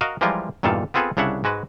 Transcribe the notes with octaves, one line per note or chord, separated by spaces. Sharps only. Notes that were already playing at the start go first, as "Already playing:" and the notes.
F#4 A#4 D#5 F5
E3 F3 G3 G#3 F4 A#4
E2 G2 A#2 D#3 A4 F5
B3 C4 F4 G#4 A4 B4
C2 C#3 D4 C#5 E5 F#5
G#2 G#3 F#4 B4